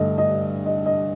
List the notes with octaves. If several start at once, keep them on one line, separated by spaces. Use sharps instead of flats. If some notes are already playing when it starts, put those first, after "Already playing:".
Already playing: G2 D3 A3 D#5
D#5
D#5
D#5